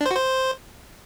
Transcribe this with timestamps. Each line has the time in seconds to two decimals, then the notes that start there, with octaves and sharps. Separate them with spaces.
0.01 D4
0.06 C5
0.11 F#4
0.16 C5